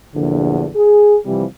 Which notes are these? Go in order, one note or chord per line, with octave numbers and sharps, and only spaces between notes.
A#1 E2 G2 D3
G#4
C3 E3 F3 G3